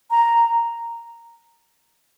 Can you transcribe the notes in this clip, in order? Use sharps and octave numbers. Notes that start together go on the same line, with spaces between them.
A#5